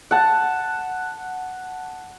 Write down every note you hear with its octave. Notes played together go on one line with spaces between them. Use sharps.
F#5 A5